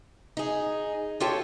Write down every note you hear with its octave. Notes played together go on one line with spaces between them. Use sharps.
D#4 G#4
F4 G4 A4 C#5 G5